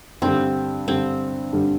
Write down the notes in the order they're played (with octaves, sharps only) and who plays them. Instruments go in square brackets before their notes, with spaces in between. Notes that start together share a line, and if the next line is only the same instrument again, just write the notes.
[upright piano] G2 D3 G3 [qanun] C4
[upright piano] G2 D3 G3 [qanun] C4
[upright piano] G2 D3 G3